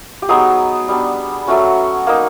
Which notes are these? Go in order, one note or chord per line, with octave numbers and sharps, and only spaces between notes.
G4
F#3 B3 D#4 G#4
G3 B3 D4
F#3 A3 C#4 F#4
A#3 D#4